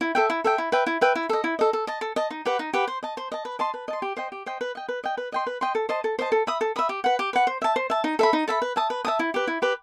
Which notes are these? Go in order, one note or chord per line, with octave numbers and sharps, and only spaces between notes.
E4
A4 E5 G5
E4
A4 E5 G5
E4
B4 E5 G5
E4
B4 E5 G5
E4
A4 D#5
E4
A4 D#5
A4
D#5 A5
A4
D#5 A5
D#4
G4 B4 F#5
D#4
G4 B4 F#5
C5
D#5 A5
C5
D#5 A5
B4
D#5 A5 C6
B4
D#5 A5 C6
G4
C5 D#5 G5
G4
C5 D#5 G5
B4
D#5 G5
B4
D#5 G5
B4
D#5 G5 C6
B4
D#5 G5 C6
A4
C5 D#5 A5
A4
C5 D#5 A5
A4
E5 B5 D#6
A4
E5 B5 D#6
G4
B4 F#5
G4
B4 F#5
C5
E5 A5
C5
E5 A5
D#4
A4 E5 B5
D#4
A4 E5 B5
B4
E5 A5 D#6
B4
E5 A5 D#6
E4
G4 B4
E4
G4 B4